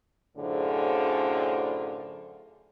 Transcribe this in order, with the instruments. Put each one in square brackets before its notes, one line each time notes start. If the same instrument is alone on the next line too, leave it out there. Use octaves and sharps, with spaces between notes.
[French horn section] F#2 A2 D3 F4 G#4 C5